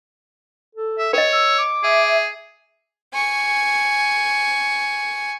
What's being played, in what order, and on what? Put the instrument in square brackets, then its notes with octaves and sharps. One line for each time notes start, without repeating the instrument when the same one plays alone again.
[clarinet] A4
[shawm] E5
[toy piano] A#4 D#5 [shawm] C#5
[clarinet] E6
D6
[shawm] G#4 [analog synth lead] E5
[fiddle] G#5 C#6